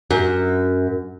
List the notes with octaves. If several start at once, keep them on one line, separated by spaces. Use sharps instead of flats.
F#2